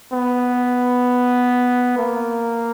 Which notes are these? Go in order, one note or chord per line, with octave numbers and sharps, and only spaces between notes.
B3
A#3